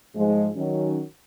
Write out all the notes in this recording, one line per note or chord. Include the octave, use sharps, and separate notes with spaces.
G#2 F3 G#3
D#3 F#3 C#4